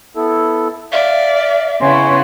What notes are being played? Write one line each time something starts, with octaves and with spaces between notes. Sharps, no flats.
B3 E4 A4
D5 E5 F5
C#3 B3 E4 C#5 G#5 C6